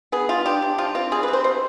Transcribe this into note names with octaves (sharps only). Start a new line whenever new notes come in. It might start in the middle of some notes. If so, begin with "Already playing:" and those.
B3 G#4
G3 F4
D4 G4
D4
F3 F4
C4 F4
G3 G#4
B4
C4
C5
B2 C5